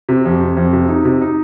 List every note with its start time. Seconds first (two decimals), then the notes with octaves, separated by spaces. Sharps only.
0.09 C3
0.25 F2
0.41 C3
0.57 F2
0.73 C3
0.89 D#4
1.05 C3
1.21 D#4